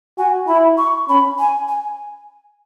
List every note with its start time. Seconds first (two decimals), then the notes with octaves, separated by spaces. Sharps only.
0.18 F#4 G#5
0.48 E4 B5
0.78 C#6
1.08 C#4 B5
1.39 G#5
1.68 G#5